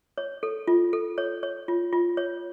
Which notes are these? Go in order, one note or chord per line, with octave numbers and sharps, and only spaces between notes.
C#5
A4
F4
A4
C#5
C#5
F4
F4
C#5